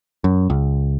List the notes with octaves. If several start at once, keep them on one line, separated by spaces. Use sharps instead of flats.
F#2
C#2